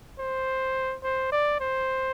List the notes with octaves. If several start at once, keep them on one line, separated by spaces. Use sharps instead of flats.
C5
C5
D5
C5